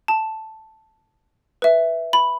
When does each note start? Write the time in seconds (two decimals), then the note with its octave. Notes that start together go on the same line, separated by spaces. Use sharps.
0.08 A5
1.62 B4 E5
2.13 B5